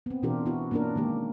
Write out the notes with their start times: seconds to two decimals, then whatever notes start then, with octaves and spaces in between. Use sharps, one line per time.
0.06 B3 C4
0.23 B2 E3 D4 F4 G4 A#4
0.46 B3 E4 F#4
0.71 A#3 C#4 D4 F4 A#4
0.95 D#3 G#3 A#3 G4